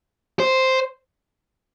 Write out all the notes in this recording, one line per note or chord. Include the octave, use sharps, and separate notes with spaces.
C5